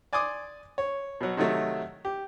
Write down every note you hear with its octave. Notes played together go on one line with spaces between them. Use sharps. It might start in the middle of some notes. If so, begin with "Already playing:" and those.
D5 G#5 C6 D6 D#6
C#5
B2 F#3
C3 D#3 F#3 A3
G4